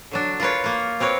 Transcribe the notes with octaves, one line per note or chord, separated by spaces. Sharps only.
D3 F#3 D4
F4 A#4 B4 C#5
A#3 F4
C4 A#4 B4 C#5